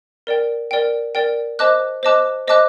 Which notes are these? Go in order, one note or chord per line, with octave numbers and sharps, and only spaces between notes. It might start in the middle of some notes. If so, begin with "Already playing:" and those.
A#4 D5 G5
A#4 D5 G5
A#4 D5 G5
C5 D#5 A5 D6 F#6
C5 D#5 A5 D6 F#6
C5 D#5 A5 D6 F#6